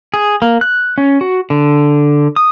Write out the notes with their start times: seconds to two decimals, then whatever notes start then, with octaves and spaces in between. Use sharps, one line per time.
0.14 G#4
0.42 A#3
0.61 F#6
0.98 C#4
1.21 F#4
1.50 D3
2.36 D#6